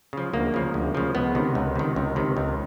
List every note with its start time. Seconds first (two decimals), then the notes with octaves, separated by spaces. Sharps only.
0.13 C#3 F3
0.33 D2 A#3
0.54 C#3 F3
0.74 D2
0.95 C#3 F3
1.15 C#2 B3
1.35 C3 D#3
1.55 C#2
1.76 C3 D#3
1.96 C#2
2.16 C3 D#3
2.37 C#2